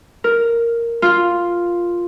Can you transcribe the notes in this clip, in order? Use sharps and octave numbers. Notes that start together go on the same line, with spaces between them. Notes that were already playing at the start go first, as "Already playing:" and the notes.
A#4
F4